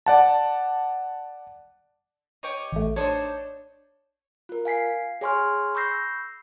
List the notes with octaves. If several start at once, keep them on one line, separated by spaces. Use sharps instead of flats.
D5 F#5 A5
G4 C#5 D#5
A1 A3
D4 D#4 C5 C#5
F4 A#4
F5 G#5 B6 C7
G#4 C#5 G#5 C6 C#6 F6
B5 C#6 E6 G6 A#6 C7